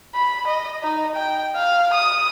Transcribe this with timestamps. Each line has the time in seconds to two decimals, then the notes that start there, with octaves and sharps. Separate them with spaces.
0.15 B5
0.48 D#5
0.82 D#4
1.16 G5
1.56 F5
1.94 D#6